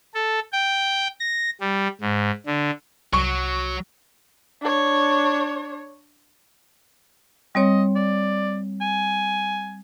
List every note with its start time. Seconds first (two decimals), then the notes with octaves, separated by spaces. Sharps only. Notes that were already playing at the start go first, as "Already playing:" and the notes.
0.14 A4
0.53 G5
1.20 A#6
1.61 G3
2.01 G#2
2.46 D3
3.13 C2 F#3 C#6
4.62 D4 C#5
7.55 G3 C4 C#5 D#5
7.96 D5
8.81 G#5